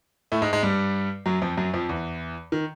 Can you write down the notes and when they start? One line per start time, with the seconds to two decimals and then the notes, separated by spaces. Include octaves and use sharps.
0.32 A2 A3
0.42 G#2 G#3
0.53 G#2 G#3
0.63 G2 G3
1.26 F#2 F#3
1.42 F2 F3
1.57 F#2 F#3
1.74 F2 F3
1.89 E2 E3
2.52 D#3